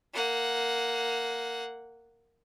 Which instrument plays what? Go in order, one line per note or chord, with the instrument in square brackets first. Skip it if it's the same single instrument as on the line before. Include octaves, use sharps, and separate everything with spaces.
[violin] A#3 F#5